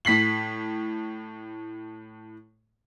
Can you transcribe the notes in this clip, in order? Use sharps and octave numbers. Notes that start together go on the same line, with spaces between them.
A2 B6 C7 F#7